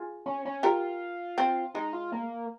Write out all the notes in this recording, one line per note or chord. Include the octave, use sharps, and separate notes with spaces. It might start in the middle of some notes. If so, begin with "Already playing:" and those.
Already playing: F4 G#4
C#4
C#4
F4 G4 A#4
C4
G#3 D#4
F4
A#3